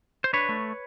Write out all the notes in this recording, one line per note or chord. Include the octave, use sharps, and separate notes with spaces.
C5
D4 B4 C#5
A3